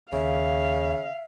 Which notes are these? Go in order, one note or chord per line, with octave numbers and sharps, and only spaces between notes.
D#2 C#3 E5 F5